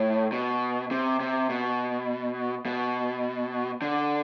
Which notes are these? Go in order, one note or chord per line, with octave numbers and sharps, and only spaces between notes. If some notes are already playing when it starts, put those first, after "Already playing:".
Already playing: A2
B2
C3
C3
B2
B2
D3